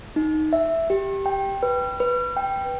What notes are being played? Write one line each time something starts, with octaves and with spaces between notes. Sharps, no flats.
D#4
E5
G4
G5
B4
B4
G5